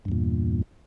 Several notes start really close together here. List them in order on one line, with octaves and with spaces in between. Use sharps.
G2 E2 A#2